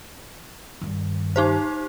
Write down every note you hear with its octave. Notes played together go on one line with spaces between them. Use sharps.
G2 D#3
D#4 G4 C5